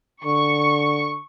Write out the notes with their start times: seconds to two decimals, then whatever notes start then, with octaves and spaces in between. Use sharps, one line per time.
0.24 D3 C#6